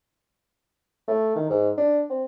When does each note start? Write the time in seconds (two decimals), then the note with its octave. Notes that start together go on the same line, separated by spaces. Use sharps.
1.08 A3
1.36 D#3
1.50 G#2
1.78 D4
2.10 C4